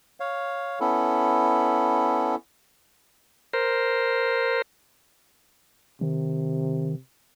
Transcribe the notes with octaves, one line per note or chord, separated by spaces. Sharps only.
C#5 F5
B3 C#4 E4 A4
A#4 C5
C3 D#3